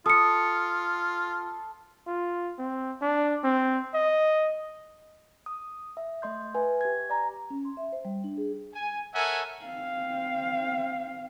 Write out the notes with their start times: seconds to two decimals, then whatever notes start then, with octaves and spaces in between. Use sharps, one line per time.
0.06 F4 A4 D#6 C#7
2.07 F4
2.59 C4
3.02 D4
3.44 C4
3.94 D#5
5.46 D#6
5.97 E5
6.22 A3 D#5 C6 G6
6.55 B4 E5 G#5
6.81 G4 G#6
7.10 D5 G#5 A#5
7.50 C#4
7.65 C6
7.77 E5
7.92 C5
8.05 G3
8.24 D4
8.38 G#4
8.73 G#5
9.14 A4 A#4 C#5 E5 F#5 G#5
9.65 C4 F5